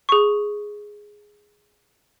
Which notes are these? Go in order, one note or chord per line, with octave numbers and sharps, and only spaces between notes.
G#4 C#6